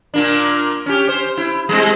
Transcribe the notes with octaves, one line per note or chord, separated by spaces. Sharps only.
A#2 A#3 D4
C#4 G4
C5
E4
G3 G#3 C4